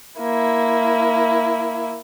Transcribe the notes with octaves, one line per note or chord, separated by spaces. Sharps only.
A#3 E4